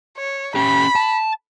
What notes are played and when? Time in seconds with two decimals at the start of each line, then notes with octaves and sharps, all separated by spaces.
0.17 C#5
0.55 C#4 G4 B5
0.96 A5